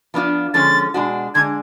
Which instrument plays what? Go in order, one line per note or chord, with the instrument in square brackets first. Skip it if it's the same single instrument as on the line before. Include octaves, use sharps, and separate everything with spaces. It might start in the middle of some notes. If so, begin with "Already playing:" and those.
[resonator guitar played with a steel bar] F3 B3 D4 F4
[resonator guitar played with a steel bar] D3 F3 G#3 C#4 [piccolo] A6
[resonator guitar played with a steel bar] B2 G#3 D4 F#4
[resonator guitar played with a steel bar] D3 G#3 D4 [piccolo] G#6